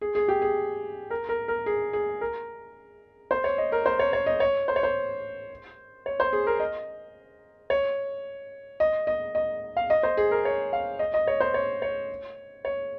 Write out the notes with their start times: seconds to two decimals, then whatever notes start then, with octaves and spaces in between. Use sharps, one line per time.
0.01 G#4
0.15 G#4
0.28 G4
0.42 G#4
1.10 A#4
1.29 A#4
1.48 A#4
1.66 G#4
1.93 G#4
2.21 A#4
3.31 C5
3.44 C#5
3.58 D#5
3.72 A#4
3.86 C5
3.99 C#5
4.13 C#5
4.26 D#5
4.40 C#5
4.68 C5
4.76 C#5
4.83 C5
6.06 C#5
6.20 C5
6.33 G#4
6.47 A#4
6.60 D#5
7.70 C#5
8.80 D#5
9.07 D#5
9.35 D#5
9.77 F5
9.90 D#5
10.03 C5
10.17 G#4
10.31 A#4
10.45 C#5
10.73 F5
10.99 D#5
11.14 D#5
11.27 C#5
11.40 C5
11.54 C#5
11.82 C#5
12.65 C#5